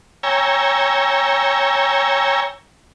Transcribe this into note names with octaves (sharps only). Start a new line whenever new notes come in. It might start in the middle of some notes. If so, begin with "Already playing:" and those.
C#5 G5 G#5 A#5 E6